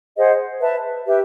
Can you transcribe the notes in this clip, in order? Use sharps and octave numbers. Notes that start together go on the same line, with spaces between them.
G#4 C5 D#5 F#5
B4 E5 A5
G4 B4 E5